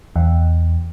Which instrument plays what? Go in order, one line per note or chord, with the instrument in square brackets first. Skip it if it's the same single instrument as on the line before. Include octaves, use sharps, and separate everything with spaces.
[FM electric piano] E2